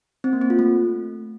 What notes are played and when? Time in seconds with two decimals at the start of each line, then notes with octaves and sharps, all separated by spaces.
0.24 C4
0.33 A#3
0.41 C4
0.50 F4
0.59 A3